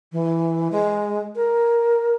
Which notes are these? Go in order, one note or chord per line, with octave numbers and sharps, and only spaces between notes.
E3
G#3
A#4